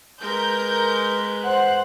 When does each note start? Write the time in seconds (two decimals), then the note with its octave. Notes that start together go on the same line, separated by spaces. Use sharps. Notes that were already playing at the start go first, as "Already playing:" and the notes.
0.21 G#3 A#4 B4 G6
1.44 C5 F#5 F#6